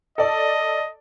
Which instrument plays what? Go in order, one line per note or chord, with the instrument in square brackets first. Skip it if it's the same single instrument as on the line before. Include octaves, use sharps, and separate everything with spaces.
[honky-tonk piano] A4 D5 [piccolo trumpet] D#5